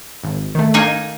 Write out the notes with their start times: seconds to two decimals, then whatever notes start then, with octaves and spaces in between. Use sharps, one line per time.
0.24 G#1
0.55 D#3 A3
0.74 A#3 D#4 G#5